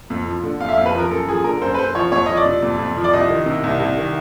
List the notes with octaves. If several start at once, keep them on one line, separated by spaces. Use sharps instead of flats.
F2
F3
D3
F2 F5
E5
F5
F2
B4
F3 A#4
F#2 A4
F3 G#4
D3 A#4
F#2 C5
B4
F#2 C5
F3 C#5
F2 C#5
F3 D#5
D5
C3
F2
F2
F3
D5
C2 D#5
D#3
C3
C2
C2
D#3